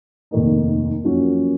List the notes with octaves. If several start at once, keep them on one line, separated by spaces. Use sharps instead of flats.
F1 D#2 D#3 A#3 D#4
F#2 F3 A#3 C#4 F#4